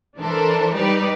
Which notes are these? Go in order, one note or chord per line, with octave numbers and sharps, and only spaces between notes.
E3 D4 A4 A#4 C5
G3 D#4 G4 B4 D5